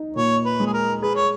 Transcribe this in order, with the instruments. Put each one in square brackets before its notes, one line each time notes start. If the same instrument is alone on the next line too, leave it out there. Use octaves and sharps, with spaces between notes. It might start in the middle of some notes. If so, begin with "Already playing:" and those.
Already playing: [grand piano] D#4
[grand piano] A#2 [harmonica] C#5
[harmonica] B4
[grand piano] G#3
[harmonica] G#4
A#4
[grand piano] G#4 [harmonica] B4
[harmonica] C#5